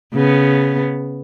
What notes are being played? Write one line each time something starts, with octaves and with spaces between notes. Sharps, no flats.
C#3 B3